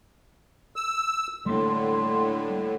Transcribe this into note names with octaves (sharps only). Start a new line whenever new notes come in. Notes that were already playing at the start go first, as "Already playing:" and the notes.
E6
A2 D3 G3 A3 A#3 C6